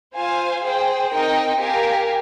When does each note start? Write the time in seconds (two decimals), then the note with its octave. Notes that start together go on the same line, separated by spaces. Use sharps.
0.15 F4 C5 F5 G#5
0.65 G#4 C5 G5
1.12 C4 D#4 A#4 D#5 G5
1.61 G4 A#4 F5 G#5